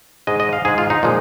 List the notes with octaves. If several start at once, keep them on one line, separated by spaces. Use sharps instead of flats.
G#2 G#3 D#5
D#5
F5
G#2 G#3 G#4
F4
D#4
A#2 F3 G#3